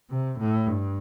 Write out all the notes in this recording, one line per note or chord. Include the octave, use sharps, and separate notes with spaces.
C3
A2
G2